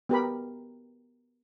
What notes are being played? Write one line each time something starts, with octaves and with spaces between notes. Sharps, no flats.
B3 G4 A#4 B5